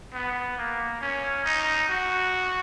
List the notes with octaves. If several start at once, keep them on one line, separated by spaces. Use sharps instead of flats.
B3
A#3
C#4
D#4
F#4